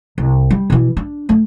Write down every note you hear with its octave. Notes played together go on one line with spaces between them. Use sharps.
C2
G3
B2 E3
D4
A3